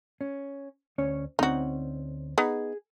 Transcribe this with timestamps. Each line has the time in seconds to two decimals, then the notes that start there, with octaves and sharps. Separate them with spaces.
0.21 C#4
0.98 D2 C#4 C#5
1.39 D2 C4 C#4 D#4 F#4
2.38 B3 D#4 G#4